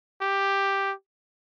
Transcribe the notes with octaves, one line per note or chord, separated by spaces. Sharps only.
G4